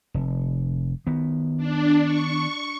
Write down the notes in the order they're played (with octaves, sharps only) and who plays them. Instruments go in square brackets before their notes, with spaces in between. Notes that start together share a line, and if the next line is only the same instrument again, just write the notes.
[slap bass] F1
D#3 B3
[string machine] D4
C#6